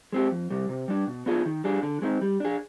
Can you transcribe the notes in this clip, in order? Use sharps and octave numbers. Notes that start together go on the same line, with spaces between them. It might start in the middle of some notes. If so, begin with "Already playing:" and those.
G#3 C4 G4
F2
C3 G3
C3
G3 D4
B2
B3 D4 F4 G#4
D#3
G3 D4 G#4
D3
G#3 C4 D#4
G3
D4 G#4